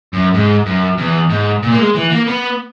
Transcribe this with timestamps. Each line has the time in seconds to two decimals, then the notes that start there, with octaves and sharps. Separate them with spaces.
0.13 F#2
0.34 G#2
0.66 F#2
0.98 E2
1.30 G#2
1.63 A#2
1.72 A#3
1.78 G#3
1.95 E3
2.10 A#3
2.27 B3